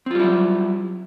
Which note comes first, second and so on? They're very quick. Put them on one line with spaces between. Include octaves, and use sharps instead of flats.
C4 F4 G3 E4 F#3